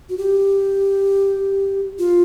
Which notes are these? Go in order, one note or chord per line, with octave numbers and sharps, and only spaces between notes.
F#4
G4
F4